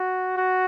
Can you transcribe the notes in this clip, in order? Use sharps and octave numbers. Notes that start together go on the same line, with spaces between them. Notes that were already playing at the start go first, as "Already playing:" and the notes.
Already playing: F#4
F#4